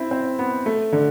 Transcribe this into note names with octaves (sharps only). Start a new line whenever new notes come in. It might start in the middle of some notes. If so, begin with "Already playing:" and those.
Already playing: C4 E4
C4
B3
A3
D3